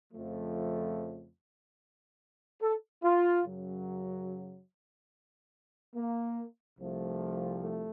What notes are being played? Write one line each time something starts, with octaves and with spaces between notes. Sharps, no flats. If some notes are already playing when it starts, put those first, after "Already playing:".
F2 C#3 F3 A3
A4
F4
F#2 C#3 F#3
A#3
C2 C3 F3 A3
A3